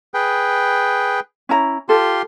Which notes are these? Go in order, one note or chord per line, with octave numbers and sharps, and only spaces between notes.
G#4 B4 G5
C#4 E4 A#5
F4 G4 A4 C6